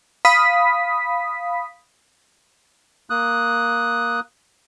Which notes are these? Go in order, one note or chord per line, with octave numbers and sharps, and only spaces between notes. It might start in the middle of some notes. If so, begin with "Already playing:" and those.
F5 B5 D#6 B6
A#3 D#6 F#6